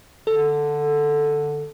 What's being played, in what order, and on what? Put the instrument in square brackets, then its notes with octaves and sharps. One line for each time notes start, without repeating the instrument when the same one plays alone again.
[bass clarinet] D3 [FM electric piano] A4